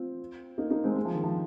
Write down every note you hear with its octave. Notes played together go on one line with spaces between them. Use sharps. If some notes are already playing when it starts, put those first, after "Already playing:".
Already playing: C4 F4
A#3 D#4
A#3 D#4
G#3 C4
G#3
F3
D#3
F3